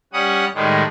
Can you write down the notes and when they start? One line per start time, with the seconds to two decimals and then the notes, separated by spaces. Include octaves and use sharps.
0.13 G3 C#4 F#5 D#6
0.55 A2 D#3 G3 G#3